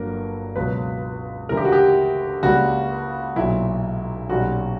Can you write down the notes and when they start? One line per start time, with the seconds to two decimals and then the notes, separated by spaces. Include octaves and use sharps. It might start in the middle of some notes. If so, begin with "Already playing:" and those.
Already playing: G1 G2 F#3 A#3 A#4
0.56 C#2 B2 F#3 B4
1.49 D2 C#3 E3 G3 A#4
1.57 G4
1.65 F#4
1.72 G4
2.43 C#2 C#3 G3 A#3 F#4
3.36 B1 A#2 F#3 E4
4.29 B1 A#2 G3 C#4 F#4